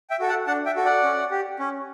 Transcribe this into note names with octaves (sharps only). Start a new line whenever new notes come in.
E5 G5
F#4 A4
F#5 A5
D4 F#5 A5
E5 G5
F#4 A4
D5 F#5
C#4
G4
C#4